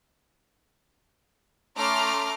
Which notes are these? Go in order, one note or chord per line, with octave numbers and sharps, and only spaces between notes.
A3 C#4 A#5 C6 D6 F6